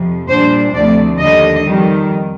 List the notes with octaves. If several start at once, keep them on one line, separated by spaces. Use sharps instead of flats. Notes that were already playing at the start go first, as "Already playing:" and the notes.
Already playing: F2 C3 F3
A#2 G3 D4 C5
D2 C3 F3 A3 D5
D#2 D3 G3 D#5
F2 D#3 G3